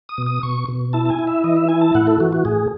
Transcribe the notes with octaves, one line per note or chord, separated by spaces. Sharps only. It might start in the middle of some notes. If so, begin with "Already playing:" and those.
D#6
B2
D#6
B2 C#6
B2
E4 A5
A5
G#5
E4
E5
E3 D#5
E5
E4 G#5
A5
A2 F#5
A4
E3 F#4
F#4
A2 G#4